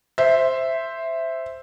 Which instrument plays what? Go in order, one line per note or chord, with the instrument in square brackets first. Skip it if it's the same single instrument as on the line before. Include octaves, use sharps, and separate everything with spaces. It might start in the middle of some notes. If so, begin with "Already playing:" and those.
[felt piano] C5 E5